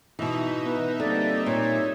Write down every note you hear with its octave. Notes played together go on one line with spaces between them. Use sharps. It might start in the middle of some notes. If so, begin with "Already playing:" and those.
B2 E3 D#4 E5
B3 B4
D3 G3 A#3 C4 D5
A#2 C#5